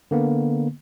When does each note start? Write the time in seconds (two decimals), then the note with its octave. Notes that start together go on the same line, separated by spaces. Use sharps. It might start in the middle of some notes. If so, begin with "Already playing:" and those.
0.11 D3 A#3 B3